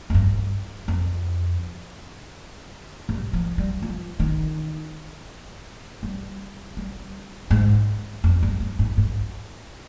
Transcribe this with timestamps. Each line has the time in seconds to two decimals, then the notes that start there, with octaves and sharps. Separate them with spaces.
0.10 F2
0.14 G2
0.88 F2
3.09 G2
3.33 F3
3.58 G3
3.82 F3
4.20 D#3
6.03 G3
6.77 G3
7.51 G#2
8.24 F2
8.43 G2
8.60 G2
8.79 G#2
8.97 G#2